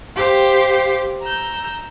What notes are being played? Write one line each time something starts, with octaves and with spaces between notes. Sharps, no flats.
G4 C5 F5 G5
A#5 E6 G6